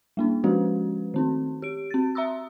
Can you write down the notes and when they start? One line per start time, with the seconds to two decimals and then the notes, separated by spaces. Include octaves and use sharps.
0.17 G3 A#3 D4
0.44 F3 G#3 C#4 F#4 B4
1.14 D#3 C4 D#4
1.62 G4 D7
1.91 C4 A6
2.15 E5 A#5 C6 D#6 E6